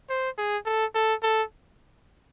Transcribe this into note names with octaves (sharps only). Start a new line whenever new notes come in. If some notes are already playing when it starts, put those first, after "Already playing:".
C5
G#4
A4
A4
A4